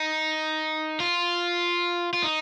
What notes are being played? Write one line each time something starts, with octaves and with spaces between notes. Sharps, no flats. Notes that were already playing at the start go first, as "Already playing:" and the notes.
Already playing: D#4
F4
F4
D#4